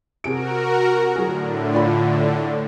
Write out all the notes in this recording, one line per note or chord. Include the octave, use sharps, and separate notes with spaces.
C3 F#4 G#4 A#4 D7
A2 D3 F#3 G#4
F4 D5 B5